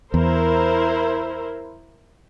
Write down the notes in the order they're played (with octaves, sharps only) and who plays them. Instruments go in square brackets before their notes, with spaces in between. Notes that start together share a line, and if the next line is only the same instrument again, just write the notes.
[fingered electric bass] E2 [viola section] E4 A#4 C5